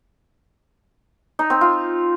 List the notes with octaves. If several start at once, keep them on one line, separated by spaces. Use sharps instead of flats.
D#4
C4
F4